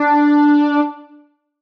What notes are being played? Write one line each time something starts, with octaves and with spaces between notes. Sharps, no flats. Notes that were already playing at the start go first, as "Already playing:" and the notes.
Already playing: D4